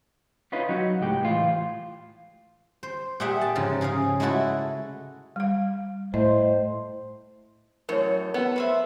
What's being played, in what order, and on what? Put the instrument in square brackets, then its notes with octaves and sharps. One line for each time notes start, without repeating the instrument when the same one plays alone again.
[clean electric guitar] C#4 D#4 F4 B4
F#3 D#4 F#4
C#2 A2 G#3 G4
A2 E3 F4
[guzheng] C5
A#2 G4 G#4 E5 F#5 G5
A5
G#2 C#3 F3
C#3 G#4 A#4 F5
G#3 A3 E4 F#4 A4
[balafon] G3 F5
[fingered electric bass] A2 [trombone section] C5 [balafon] D#5
[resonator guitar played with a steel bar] F#2 A2 [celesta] A#4 C#5
[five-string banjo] B3 [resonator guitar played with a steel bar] A4
[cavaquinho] B4 C5 E5